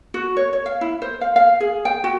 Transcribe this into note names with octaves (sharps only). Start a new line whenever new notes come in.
F#4
C#5
C#5
F5
E4
C5
F5
F5
G#4
G5
F#4